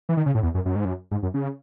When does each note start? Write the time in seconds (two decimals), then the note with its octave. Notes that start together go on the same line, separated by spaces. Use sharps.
0.09 E3
0.17 D#3
0.26 C#3
0.35 A2
0.43 E2
0.54 F#2
0.66 F#2
0.76 G#2
0.85 F#2
1.11 G#2
1.23 F#2
1.34 C#3